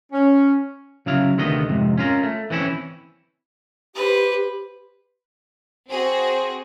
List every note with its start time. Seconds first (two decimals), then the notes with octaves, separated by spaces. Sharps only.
0.12 C#4
1.06 C#3 F#3 E4 F5
1.37 D2 C3 D#3 A3 B3 D#5
1.69 F2 G#2 C3
1.98 C#4 F4 A#4
2.23 A3
2.50 E3 C4 C#4 E4
3.96 G4 B4 C5
5.90 C4 F#4 G#4 C5